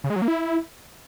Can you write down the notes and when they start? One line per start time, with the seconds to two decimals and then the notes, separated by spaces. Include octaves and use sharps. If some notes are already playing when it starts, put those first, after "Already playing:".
0.04 C#3
0.10 G#3
0.16 F#3
0.22 A#3
0.28 E4